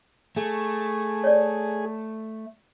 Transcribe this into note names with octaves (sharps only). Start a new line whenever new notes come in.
A3 G#4
C#5 D5